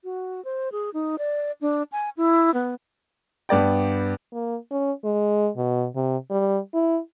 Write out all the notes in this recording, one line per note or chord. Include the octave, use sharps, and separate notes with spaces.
F#4
C5
G#4
D#4
D5
D4
G#5
E4
B3
G2 B3 D5 G5
A#3
C#4
G#3
B2
C3
G3
E4